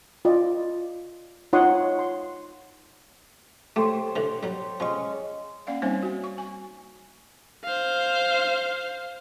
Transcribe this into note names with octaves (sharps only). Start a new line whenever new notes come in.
F4 D5 D#5
D#4 F4 C#5 F#5 C6 D#6
C6
A3 G4 C5 C#5
D3 E3
F#3 G3
F3 G#3 C#4 C#6
A#3 C#4 D5 F5 F#5
G3 A#3 C4 D#4 C5 C#5
F#4 G#5
C#6
G#5
C5 F5